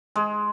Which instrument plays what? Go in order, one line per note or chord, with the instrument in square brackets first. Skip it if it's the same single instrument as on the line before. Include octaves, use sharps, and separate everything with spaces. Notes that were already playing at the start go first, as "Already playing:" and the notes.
[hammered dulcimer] G#3